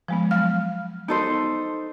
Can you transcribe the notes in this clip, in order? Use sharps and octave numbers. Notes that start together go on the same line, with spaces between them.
F3 G#3 B3
F#3 F5 F6
B3 D#4 A4 C5